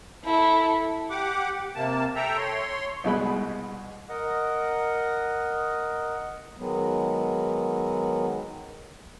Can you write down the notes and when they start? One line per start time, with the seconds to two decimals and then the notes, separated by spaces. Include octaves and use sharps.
0.24 E4 A4
1.10 G4 F#5 D6
1.75 C3 A#3 A5
2.15 A4 E5 G5 A#5
2.37 C#5 C6
3.04 C2 B2 G#3 B5
4.09 A#4 D#5 F#5
6.57 D#3 F#3 G#3 B3